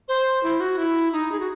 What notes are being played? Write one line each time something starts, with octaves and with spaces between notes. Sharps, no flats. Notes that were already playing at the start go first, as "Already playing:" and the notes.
C5
E4
F#4
E4
D#4
G#4
F#4